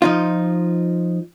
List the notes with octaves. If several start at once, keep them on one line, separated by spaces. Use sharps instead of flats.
F3 D#4 F4